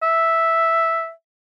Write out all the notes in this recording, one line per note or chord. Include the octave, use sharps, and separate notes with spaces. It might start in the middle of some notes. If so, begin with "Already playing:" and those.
E5